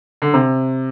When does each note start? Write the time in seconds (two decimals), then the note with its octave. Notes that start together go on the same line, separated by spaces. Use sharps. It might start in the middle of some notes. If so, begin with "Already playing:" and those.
0.22 D3
0.34 C3